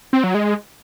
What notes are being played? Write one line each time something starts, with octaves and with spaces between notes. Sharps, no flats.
C4
F#3
G#3